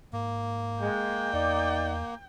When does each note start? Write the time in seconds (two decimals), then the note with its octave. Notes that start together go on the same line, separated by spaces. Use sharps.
0.13 G#2 A#3
0.81 G#3 G5
1.33 E2 D#4 D5